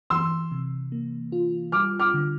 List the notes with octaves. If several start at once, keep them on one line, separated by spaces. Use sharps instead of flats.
E3 C6 E6
C3
A#3
F4
G3 D6 F6
D6 F6
D3